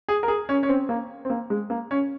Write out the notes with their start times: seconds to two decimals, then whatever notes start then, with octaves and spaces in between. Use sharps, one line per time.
0.08 G#4
0.23 A#4
0.28 G#4
0.49 C#4
0.63 C#4
0.69 C4
0.89 A#3
1.25 C4
1.30 A#3
1.50 G#3
1.70 A#3
1.91 C#4